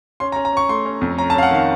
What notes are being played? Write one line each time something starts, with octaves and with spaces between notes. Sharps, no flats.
C#4 C6
A#5
C#4
A#5
C#4 C#6
A3 C6
C#4
F2
C#4 A#5
A5
C#4 F5
F#5
D#3 F5